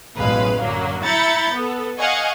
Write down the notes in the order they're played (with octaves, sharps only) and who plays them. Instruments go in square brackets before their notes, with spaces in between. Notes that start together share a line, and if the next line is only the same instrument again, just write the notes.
[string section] A1 F#2 B2 G#3 B4 F5
F#2 D3 F#3 A#3
E4 A#5 B5 G6 A6 C#7
B3 A4
D#5 F5 F#5 G#5 C#6